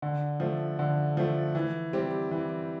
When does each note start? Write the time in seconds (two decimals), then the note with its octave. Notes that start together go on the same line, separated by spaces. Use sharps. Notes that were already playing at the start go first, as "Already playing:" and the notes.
0.02 D3
0.40 F3 A3
0.79 D3
1.17 F3 A3
1.55 E3
1.93 G3 C4 G4
2.31 E3